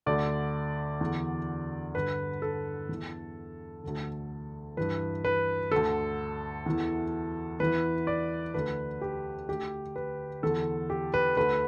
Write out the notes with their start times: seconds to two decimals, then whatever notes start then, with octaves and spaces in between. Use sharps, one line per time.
0.06 D2 D3 D5
1.01 E2 D3
1.95 G2 D3 B4
2.42 A4
2.89 E2 E3
3.83 D2 D3
4.77 G2 E3 B4
5.25 B4
5.71 D2 D3 A4
6.66 E2 E3
7.60 E2 E3 B4
8.07 D5
8.54 D2 D3 B4
9.01 G4
9.48 D2 D3 G4
9.96 B4
10.43 E2 D3 A4
10.90 G4
11.14 B4
11.37 D2 D3 B4